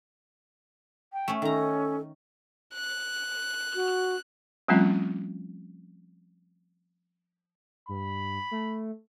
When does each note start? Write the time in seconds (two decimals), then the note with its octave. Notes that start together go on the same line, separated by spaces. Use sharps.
1.13 G5
1.28 A3 C#4
1.42 D#3 C#4 A4 A#5
2.74 F#6
3.75 F#4
4.68 F3 G3 A3 C4 C#4 F4
7.89 G2 B5
8.51 A3